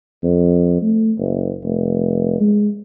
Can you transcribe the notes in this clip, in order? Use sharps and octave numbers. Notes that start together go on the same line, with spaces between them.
F2
A3
F#1
F1
G#3